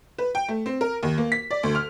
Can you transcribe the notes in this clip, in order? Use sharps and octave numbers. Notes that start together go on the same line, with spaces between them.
B4
G5
A3
C4
A#4
D#2
A#3
B6
D5
D2
F6